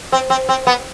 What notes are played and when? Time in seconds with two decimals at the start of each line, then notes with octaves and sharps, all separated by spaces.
0.12 C4
0.30 C4
0.49 C4
0.67 B3